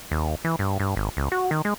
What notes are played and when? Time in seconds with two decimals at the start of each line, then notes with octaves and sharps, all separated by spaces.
0.11 D#2
0.45 E3
0.59 G2
0.80 G2
0.96 G#1
1.17 C#2
1.32 F#4
1.51 D#3
1.65 G#3